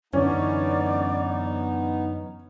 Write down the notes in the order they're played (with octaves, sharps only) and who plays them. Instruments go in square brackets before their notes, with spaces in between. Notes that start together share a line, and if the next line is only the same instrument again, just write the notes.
[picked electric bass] F#2 D3 E3 [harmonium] B3 D#4 [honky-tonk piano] C#4 [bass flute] D5